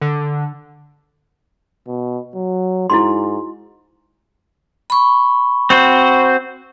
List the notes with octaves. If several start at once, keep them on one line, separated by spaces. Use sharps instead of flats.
D3
B2
F#3
G#2 E4 F#4 C6
B5 C#6
C4 F#4 C5